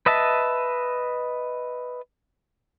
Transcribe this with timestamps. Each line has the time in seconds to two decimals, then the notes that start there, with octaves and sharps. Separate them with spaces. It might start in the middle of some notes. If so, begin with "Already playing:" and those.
0.06 B4 D#5 E5 A5